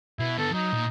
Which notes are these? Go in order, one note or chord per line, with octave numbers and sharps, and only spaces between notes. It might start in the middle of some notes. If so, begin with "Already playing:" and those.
B2 E4
D3 B3 A4
F#3 D#4
A#2